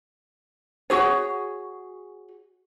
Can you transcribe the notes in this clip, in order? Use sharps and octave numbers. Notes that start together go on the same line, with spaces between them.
F#4 G#4 C#5